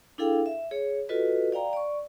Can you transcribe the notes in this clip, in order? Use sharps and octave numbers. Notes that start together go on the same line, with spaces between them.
D4 E4 G#4 A4 F5 G5
E5
G#4 C#5
F4 F#4 A4 B4 D#5
D5 F5 G5 A#5
D5 C#6